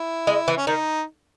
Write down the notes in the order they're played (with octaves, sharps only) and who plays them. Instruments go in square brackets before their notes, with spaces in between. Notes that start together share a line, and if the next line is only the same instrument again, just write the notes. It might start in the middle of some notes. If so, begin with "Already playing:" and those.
Already playing: [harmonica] E4
[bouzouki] G#3
E3
[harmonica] C#4
[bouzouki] D#3 [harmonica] D#4